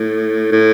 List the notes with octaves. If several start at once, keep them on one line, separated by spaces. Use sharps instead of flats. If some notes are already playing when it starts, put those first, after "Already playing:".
Already playing: A2
A2